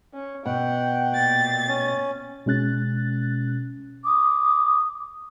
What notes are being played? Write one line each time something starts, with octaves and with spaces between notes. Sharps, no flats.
C#4
B2 F#5 G5
A#2 A6
C#4
B2 G#3 C#4 F#6 A6
D6 D#6